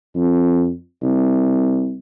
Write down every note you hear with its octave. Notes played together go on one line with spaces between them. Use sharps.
F2
C2